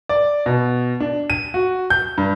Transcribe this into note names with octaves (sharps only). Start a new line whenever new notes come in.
D5
B2
D4
D#7
F#4
G6
G2